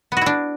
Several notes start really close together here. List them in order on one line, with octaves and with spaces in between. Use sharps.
B3 F#4 E4 D4